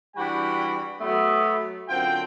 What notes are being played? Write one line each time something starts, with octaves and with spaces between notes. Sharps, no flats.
E3 G3 D4 F#4 G5 B5
F#3 A3 B3
F#2 D3 C4 F4 G5